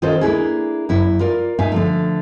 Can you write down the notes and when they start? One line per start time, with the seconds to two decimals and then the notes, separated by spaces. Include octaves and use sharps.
0.02 D#3 C#4 F4 A4 C5
0.21 A#3 D4 E4 G#4
0.89 F#2 E4
1.20 F4 A#4 D5
1.59 A#2 D#4 E5 F5 G#5
1.72 D3 F3 A3